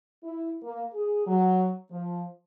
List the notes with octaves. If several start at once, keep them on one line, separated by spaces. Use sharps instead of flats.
E4
A#3
G#4
F#3
F3